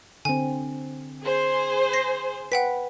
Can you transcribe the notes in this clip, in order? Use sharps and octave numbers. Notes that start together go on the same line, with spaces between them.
D3 C4 G#5
G#4 C5
A#6 C7
B4 F#5 G5 B6